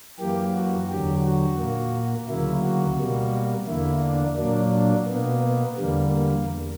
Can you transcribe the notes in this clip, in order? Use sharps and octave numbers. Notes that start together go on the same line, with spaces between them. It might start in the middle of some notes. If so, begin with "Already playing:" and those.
F#2 E3 A#3 G4
F#4
E2 D3 F#3 G4
F#4
A#2 A#3
D2 C#3 F#3 A#3 E4
F#4
B2 G3 A#3
E2 D3 A#3 E4
D4
A#2 F#3 A#3 D4
D4
B2 A#3 B3
B3
E2 D3 G3 A#3
A#3
E2